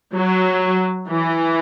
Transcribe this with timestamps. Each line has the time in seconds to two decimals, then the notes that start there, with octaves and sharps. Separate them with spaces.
0.14 F#3
1.09 E3